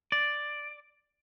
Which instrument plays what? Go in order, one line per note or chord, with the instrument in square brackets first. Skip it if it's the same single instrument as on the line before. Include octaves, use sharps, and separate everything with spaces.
[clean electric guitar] D5